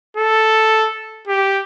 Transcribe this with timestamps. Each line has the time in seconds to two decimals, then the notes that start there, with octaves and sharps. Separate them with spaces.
0.17 A4
1.27 G4